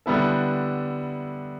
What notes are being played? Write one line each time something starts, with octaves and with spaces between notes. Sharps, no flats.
D3 G3 B3 E4 A4